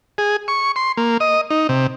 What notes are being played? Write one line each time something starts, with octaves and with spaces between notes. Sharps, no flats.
G#4
C#6
C6
A#3
D#5
D#4
C3